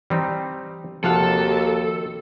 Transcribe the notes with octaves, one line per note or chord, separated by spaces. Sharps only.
E3 G3 C4 D#4
D#2 C3 F3 F#4 A4 F5 F#5